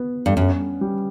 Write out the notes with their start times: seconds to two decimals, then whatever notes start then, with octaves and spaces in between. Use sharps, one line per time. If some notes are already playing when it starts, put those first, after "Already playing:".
Already playing: B3
0.26 G2
0.37 F#2 C#4
0.81 G3